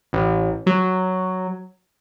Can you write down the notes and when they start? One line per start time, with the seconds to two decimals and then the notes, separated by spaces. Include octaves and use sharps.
0.13 A1
0.66 F#3